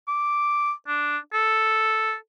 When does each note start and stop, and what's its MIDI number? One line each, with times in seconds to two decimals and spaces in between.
0.08 0.72 86
0.87 1.18 62
1.33 2.14 69